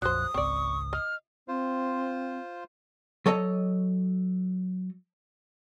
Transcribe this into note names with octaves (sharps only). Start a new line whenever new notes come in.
A#1 F2 F#3 C5 D#6 F#6
G#1 C#2 C4 D5 C#6
D#5 F6
C4 F4 C5
F#3 A4 C#5 D#5